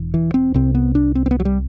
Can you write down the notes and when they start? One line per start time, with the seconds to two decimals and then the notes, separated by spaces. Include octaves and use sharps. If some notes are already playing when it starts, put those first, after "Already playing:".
Already playing: E1 E2
0.14 E3
0.34 C4
0.54 C2 C3 C4
0.75 B3
0.95 D4
1.15 C4
1.26 C4
1.31 B3
1.40 F#3
1.45 G3